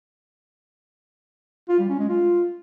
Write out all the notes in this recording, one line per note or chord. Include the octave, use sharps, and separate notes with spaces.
F4
G3
C#4
G#3
F4